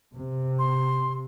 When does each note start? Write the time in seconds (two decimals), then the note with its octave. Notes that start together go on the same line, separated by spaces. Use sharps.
0.14 C3
0.59 C6